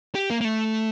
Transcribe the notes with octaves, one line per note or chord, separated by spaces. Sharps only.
G4
A#3
A#3
A3